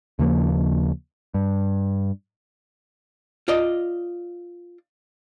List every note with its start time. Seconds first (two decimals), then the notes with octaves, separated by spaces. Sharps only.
0.19 D#2 C#3 F3 A#3
1.34 G2
3.48 F4 D5 D#5